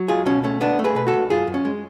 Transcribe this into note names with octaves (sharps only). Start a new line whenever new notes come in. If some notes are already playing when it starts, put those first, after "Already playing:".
Already playing: F#3
C#2 F4 G#4
B2 C#4
A3 C#4
C#2 B3 D4
A3
G#4 B4
B2 B4
F#4 A4
C#2
F#2 F4 G#4
F#2
C#4
G#3